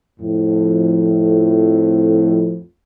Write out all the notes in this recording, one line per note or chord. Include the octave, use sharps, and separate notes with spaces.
F2 A2